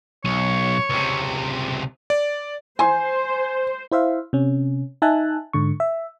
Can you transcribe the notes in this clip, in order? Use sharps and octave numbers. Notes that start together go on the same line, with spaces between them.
B1 C#5
C#2 C3
D5
C5 G#5 C6
E4 C5 E5 F5
C3 C#4
D#4 E5 G#5 A5 F#6
G#2 D3 C#6
E5